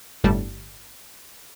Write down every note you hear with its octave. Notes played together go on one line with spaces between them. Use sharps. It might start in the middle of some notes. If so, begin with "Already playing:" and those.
G1 A2 G3 A5